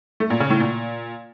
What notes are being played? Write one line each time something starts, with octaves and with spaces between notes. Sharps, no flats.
A3
A#2
C#3
A2
A#2